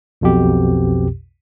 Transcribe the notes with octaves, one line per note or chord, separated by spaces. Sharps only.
B1 F2 B2 G4